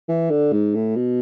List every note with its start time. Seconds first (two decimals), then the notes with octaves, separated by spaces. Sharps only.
0.08 E3
0.31 D3
0.52 G#2
0.75 A2
0.96 B2